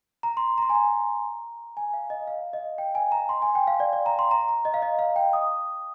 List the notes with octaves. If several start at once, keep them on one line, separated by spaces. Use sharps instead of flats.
A#5
C6
A#5
C6
G#5
A#5
G#5
F5
D#5
F5
D#5
G5
G#5
A#5
C6
G#5
G5
F5
D5
D5
A#5
C6
A#5
A#5
D#5
F5
D#5
F5
G5
D#6